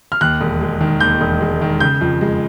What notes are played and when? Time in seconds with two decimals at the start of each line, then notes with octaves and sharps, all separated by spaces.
0.12 F6
0.21 D#2 F#6
0.41 E1
0.61 G#3
0.81 D#3
1.00 D#2 G6
1.21 E1
1.41 G#3
1.61 D#3
1.80 C#3 G6
2.01 F2
2.21 G#3